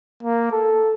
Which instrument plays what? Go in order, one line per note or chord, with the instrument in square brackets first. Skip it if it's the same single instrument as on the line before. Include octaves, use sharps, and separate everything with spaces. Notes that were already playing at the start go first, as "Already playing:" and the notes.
[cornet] A#3
A4